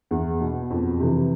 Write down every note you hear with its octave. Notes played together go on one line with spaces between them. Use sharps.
E2
B2
F2
C3 E3